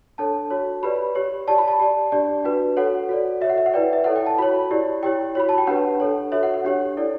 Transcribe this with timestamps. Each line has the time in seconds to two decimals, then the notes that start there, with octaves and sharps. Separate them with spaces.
0.18 D4 A4 C#5 A5
0.50 F#4 C#5
0.83 G4 B4 D5 B5
1.15 G4 C#5
1.47 G4 D5 A5
1.58 B5
1.68 A5
1.80 G4 D5
2.12 D4 G4 D5
2.44 D4 F#4 B4
2.77 F#4 A4 C#5 F#5
3.09 F#4 A4 D5
3.41 F#4 C#5 E5
3.50 F#5
3.58 E5
3.66 F#5
3.74 E4 B4 D5 G5
3.93 E5
4.04 E4 A4 C#5 F#5
4.16 G5
4.27 A5
4.38 F#4 C#5 B5
4.71 E4 G4 D5
5.03 E4 G4 C#5 G5
5.35 F#4 C#5 B5
5.49 A5
5.58 G5
5.67 D4 G4 B4 F#5
6.00 D4 A4 C#5
6.32 F#4 A4 C#5 E5
6.43 F#5
6.54 F#5
6.65 D4 G4 C#5
6.97 E4 A4 D5